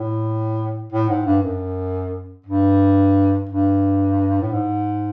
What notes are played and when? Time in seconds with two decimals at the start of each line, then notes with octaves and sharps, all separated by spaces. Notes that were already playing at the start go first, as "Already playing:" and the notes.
Already playing: A2
0.92 A2
1.09 G#2
1.26 G2
1.43 F#2
2.46 G2
3.49 G2
4.42 A2
4.52 G#2